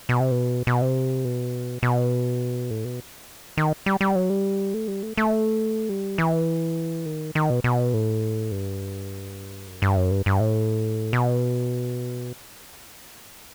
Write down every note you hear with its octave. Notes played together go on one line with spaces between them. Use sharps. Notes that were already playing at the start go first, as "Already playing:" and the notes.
B2
C3
B2
B2
C3
B2
B2
A2
B2
D#3
G3
G3
F#3
G3
A3
G3
A3
A3
G3
E3
D#3
D#3
B2
B2
A2
G2
F#2
G2
F#2
G2
G2
A2
B2